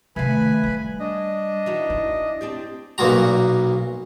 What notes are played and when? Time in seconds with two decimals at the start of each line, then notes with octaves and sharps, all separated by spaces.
0.16 C3 D#3 A3 B4 F5 G#5 B5
0.64 G3
0.99 D4 D#5
1.66 E3 D#4 F#4
1.90 E4
2.41 C4 D4 G4
2.98 B1 A#2 B3 F#4 A#5